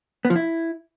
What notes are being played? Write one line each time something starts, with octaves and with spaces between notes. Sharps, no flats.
B3
F3
E4